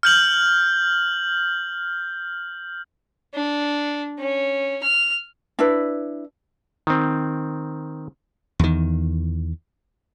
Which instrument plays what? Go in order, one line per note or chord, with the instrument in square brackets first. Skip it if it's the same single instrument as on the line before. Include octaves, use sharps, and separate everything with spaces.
[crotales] F6 G6 F#7
[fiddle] D4
C#4
F6
[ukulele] D4 E4 B4
[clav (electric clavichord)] D#3 C4
[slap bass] E2 D#3